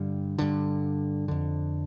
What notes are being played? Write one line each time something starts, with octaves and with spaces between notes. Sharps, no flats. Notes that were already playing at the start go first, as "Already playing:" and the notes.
Already playing: G2 D3 G3
G2 D3
F2 D3